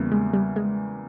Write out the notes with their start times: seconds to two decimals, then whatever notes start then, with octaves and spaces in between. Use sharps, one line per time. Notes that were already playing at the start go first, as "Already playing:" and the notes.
Already playing: E2 C#3 G3 A#3
0.12 G#3
0.34 G3
0.56 G#3